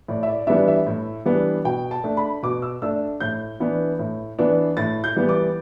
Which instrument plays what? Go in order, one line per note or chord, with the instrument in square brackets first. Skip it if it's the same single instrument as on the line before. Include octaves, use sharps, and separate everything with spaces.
[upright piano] A2 D5
E5
D5
E3 G3 B3 D4 E5
E5
A2
E3 G3 B3 D4
B2 G5
A5
A3 D4
B5
B2 D6
E6
A3 D4 E6
A2 G6
E3 B3 D4
A2
E3 B3 D4
A2 A6
G6
E3 G3 B3
D6